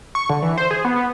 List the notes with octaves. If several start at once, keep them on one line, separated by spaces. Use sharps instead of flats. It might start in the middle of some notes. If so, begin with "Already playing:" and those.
C#6
D3
E3
C5
G#4
B3
B3